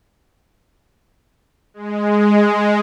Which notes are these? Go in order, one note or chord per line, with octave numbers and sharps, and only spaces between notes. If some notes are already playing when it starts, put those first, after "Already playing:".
G#3